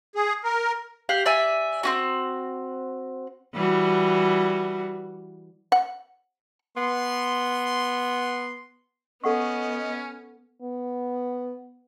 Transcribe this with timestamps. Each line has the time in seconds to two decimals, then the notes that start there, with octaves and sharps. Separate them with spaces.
0.15 G#4
0.44 A#4
1.09 G4 F5 F#5
1.26 D5 E5 G#5
1.83 C4 C#4 F#4
3.54 E3 G3 F#4
5.72 F#5
6.77 B3 C6
9.24 B3 C#4 A4 D#5 F#5 C#6
10.62 B3